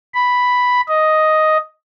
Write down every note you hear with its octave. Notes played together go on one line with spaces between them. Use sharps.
B5
D#5